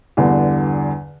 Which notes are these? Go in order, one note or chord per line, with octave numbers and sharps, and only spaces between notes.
E2 G2 D3